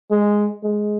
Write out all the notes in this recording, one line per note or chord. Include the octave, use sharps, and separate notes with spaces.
G#3
G#3